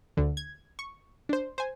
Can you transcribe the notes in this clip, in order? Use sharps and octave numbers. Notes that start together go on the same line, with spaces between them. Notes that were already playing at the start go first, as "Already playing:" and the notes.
D2 D3
G#6
C#6
D4 C5
C5 G#5